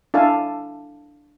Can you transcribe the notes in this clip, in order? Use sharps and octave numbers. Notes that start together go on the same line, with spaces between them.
D4 E4 A4 F5 G#5 A5